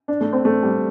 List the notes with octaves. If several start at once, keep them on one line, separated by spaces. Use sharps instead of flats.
D4
A3
C4
A3
G3